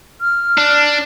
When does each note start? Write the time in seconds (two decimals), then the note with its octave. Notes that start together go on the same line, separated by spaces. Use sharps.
0.21 F6
0.58 D4